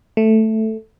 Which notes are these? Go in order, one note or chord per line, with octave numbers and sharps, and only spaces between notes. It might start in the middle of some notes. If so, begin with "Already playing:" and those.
A3